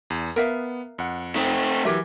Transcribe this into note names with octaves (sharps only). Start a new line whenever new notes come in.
E2
B3 A#4 E5 F5
F2 F#5
A3 C4 D#4
E3 F#3 G4 A#4 E5